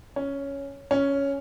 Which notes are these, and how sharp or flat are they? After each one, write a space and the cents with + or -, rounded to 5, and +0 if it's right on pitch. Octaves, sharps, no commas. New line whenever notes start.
C#4 +5
C#4 +5